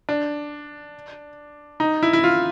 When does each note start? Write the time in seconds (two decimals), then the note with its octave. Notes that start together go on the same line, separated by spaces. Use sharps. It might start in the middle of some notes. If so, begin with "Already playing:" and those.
0.09 D4
1.80 D#4
2.03 E4
2.13 E4
2.24 F4